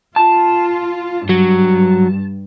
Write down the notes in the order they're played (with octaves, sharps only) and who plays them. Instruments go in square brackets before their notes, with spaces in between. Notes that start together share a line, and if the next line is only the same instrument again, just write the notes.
[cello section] F4 [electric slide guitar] A5
[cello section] G2 [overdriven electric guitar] F#3